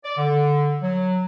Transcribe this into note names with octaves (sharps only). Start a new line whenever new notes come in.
D5
D3
F#3